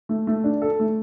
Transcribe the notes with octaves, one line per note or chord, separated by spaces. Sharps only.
A3
A3
D4
A4
A3